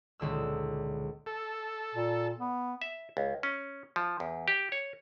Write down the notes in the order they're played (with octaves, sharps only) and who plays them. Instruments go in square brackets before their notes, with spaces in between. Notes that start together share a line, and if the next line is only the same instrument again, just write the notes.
[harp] D#1 C#2 D3 E6
[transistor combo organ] A4
[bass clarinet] A#2
B3
[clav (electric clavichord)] E5
C#2
C#4
F3
E2
G4
C#5